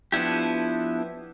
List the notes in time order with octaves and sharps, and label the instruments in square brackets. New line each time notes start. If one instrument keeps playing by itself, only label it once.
[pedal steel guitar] F3 B3 D4 E4 G4